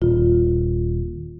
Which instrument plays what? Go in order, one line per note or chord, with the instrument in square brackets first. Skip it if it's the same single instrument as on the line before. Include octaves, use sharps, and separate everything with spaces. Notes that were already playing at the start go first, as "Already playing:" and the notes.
[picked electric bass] D#1 [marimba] F4